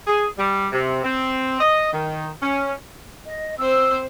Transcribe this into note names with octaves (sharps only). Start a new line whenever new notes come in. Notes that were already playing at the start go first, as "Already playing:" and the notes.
G#4
G3
C3
C4
D#5
D#3
C#4
D#5
C4 C5 E6